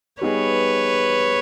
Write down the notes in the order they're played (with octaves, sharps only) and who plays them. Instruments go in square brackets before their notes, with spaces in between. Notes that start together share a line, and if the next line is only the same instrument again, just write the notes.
[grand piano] G3 B3 D#4 G#4 [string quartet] B4 C#5